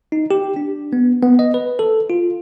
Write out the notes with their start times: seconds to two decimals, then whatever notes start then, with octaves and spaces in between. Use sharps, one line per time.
0.12 D#4
0.31 G4
0.56 D4
0.93 B3
1.23 B3
1.39 D#5
1.54 B4
1.79 A4
2.10 F4